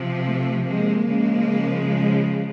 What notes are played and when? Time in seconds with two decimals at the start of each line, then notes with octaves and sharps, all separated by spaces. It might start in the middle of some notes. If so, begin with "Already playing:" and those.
Already playing: C3 F3
0.24 A3
0.66 G#3 A#3
1.08 C#3 F3 G#3